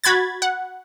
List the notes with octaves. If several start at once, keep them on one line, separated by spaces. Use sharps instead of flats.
F#4 B5 G#6 A6
F#5